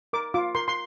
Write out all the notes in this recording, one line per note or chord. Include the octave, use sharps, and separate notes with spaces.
A#4 D6
F4 D6
A#4 C6
C6